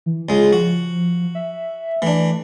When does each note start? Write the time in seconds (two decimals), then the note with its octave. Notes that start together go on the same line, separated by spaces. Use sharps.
0.06 E3
0.29 C#2 G#3 F4
0.53 F3 F#4
1.35 E5
2.02 E3 A3 D4